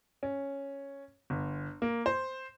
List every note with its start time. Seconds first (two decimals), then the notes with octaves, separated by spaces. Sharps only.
0.23 C#4
1.30 G1
1.82 A#3
2.06 C5